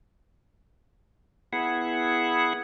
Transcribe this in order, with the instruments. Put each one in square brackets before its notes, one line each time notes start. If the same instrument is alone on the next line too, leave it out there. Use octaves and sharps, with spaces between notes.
[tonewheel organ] B3 E4 G#4 F#5